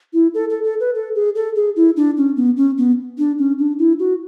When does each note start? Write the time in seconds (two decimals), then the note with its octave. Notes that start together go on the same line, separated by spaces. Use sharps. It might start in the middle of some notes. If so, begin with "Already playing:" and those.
0.13 E4
0.34 A4
0.50 A4
0.64 A4
0.80 B4
0.95 A4
1.15 G#4
1.35 A4
1.56 G#4
1.76 E4
1.97 D4
2.17 C#4
2.37 B3
2.57 C#4
2.78 B3
3.18 D4
3.38 C#4
3.59 D4
3.79 E4
3.99 F#4